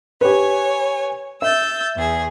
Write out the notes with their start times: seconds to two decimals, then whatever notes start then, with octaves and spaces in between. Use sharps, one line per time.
0.21 G4 B4 C#5 G#5
1.42 E5 E6 G6 A6
1.96 E2 G#4